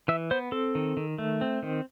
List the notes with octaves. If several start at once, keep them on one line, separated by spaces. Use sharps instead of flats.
E3 E5
B3 C5
C4 A4
D#3
D#3
A3
C4
D#3